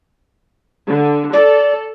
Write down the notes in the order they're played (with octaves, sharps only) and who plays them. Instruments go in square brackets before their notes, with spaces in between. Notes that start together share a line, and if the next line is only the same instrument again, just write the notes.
[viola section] D3
[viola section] A4 [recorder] D5